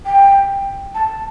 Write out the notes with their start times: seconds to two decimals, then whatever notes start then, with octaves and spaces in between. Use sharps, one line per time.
0.06 G5
0.95 A5